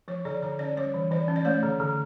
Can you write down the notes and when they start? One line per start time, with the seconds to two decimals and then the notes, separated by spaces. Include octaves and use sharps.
0.08 F3 C#5
0.25 D3 D5
0.42 D3 C#5
0.59 C#4 D5
0.77 G3 C#5
0.94 E3
1.11 E3 D5
1.28 C#4
1.36 D5
1.45 A3 C#5
1.63 D3
1.80 D3